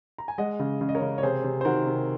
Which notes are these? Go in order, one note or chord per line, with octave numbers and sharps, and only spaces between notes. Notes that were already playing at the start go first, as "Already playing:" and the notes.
A#5
G#5
G#3 D#5 F#5
C#3
C#3
D#5
A#4 C#5
C#3
C#5
C3 G#4 C5
C3
C5
D#3 F#4 A#4
C3